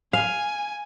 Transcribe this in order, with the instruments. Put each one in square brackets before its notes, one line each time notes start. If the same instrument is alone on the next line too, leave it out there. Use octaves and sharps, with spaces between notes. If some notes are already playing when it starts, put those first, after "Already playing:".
[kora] F5 [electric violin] G#5